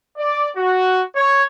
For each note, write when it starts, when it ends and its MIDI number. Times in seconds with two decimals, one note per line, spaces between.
0.17 0.49 74
0.56 1.02 66
1.16 1.43 73